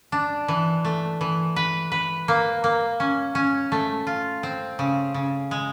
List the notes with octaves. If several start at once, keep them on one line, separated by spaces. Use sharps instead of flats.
D4
E3
A3
E3
B4
B4
A#3
A#3
C#4
C#4
A3
F4
C4
C#3
C#3
G#3